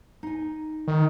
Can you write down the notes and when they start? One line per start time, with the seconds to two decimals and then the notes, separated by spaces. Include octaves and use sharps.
0.23 D#4 G#5
0.88 D#3